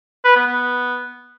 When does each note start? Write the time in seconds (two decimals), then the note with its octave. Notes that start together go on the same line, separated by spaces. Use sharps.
0.25 B4
0.36 B3
0.47 B3